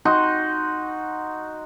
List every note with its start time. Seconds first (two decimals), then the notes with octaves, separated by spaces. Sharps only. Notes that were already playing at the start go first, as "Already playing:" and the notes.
0.05 D#4 F#4 C6